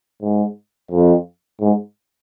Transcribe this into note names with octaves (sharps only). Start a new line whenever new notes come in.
G#2
F2
G#2